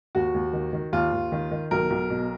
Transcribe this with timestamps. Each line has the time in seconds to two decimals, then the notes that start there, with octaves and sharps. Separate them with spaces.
0.15 D#2 F#4
0.34 D#2
0.53 D#3
0.73 D#3
0.92 D#2 F4
1.12 D#2
1.32 D#3
1.51 D#3
1.71 B1 A#4
1.90 B1
2.10 B2